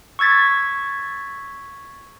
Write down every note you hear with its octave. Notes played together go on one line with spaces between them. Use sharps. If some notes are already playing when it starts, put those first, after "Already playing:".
C#6 E6 G#6 A6 B6